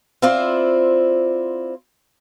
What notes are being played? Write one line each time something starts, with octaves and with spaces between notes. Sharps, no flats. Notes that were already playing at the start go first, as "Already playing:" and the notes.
C4 E4 F4 C5 D5